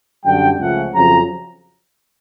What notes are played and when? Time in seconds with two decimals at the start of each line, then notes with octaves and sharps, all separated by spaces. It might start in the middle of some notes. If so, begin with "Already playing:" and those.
0.24 F#2 D3 G3 G5
0.59 C#2 C#3 F3 A3 C#4 F#5
0.94 F2 C#3 F#3 A#5